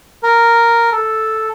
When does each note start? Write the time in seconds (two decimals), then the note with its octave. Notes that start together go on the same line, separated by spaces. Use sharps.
0.23 A#4
0.92 A4